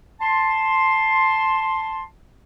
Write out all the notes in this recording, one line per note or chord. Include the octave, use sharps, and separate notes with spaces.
A5 C6